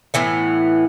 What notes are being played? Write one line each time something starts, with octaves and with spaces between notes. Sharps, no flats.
A2 E3 B3